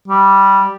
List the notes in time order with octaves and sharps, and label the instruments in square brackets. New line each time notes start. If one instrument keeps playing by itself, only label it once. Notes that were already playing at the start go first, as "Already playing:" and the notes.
[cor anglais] G3